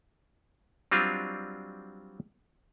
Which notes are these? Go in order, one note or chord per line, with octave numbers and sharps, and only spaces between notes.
F#3 G3 C4 D4 F4